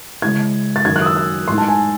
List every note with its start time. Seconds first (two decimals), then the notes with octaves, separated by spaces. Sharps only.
0.22 C#3 G#3 C#4 E4 G#6
0.76 A6
0.85 F#2 D#3 F#3 G#6
0.96 F#6
1.02 D#6
1.06 E6
1.16 E6
1.48 A2 G#3 D#4 C6
1.58 A5
1.68 G#5